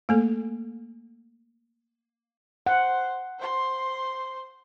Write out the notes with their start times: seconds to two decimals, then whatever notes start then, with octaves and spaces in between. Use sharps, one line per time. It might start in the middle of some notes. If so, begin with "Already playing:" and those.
0.09 A3 A#3 A4
2.66 C5 F#5
3.39 C5 C6